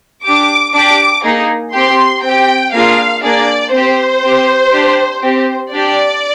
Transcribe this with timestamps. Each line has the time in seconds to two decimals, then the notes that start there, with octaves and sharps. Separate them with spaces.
0.24 D4 G4 D6
0.73 D4 G4 D6
1.24 A#3 D#4 G#4
1.74 C4 G4 C6
2.23 C4 G4 G5
2.73 A#3 D4 F4 G#4 F5
3.23 A#3 D4 G#4 D5
3.73 C4 G4 C5
4.22 C4 G4
4.72 D4 G4
5.22 C4 G4
5.72 D4 G4 D5